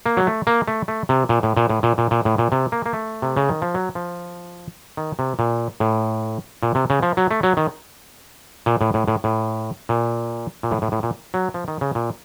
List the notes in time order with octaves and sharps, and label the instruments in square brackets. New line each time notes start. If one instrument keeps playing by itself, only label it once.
[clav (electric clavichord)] A#3
F#3
A3
A#3
A3
A3
C3
A#2
A2
A#2
A2
A#2
A#2
A#2
A2
A#2
C3
A#3
A#3
A3
C3
C#3
D#3
F3
F#3
F3
D#3
C3
A#2
A2
A#2
C3
C#3
F3
F#3
A3
F#3
D#3
A#2
A2
A2
A2
A2
A#2
A#2
A2
A2
A2
A#2
F#3
F3
D#3
C#3
A#2